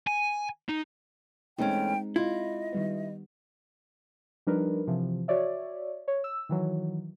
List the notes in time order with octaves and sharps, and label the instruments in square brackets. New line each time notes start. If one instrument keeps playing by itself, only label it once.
[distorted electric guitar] G#5
D#4
[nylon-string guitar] E2 A3 C#4 [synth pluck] G#3 C4 D#4 [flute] G5
[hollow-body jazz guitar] E4 [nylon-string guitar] F4 [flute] D#5
[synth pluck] D#3 G3 B3
[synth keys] F3 G3 D4 D#4 A#4 B4
C3 E3 F3
F#4 C#5 D5 E5
C#5
E6
D#3 E3 F#3